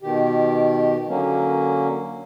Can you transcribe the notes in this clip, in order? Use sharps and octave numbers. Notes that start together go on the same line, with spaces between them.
B2 D#3 G4
D3 F#3 A#3 C#4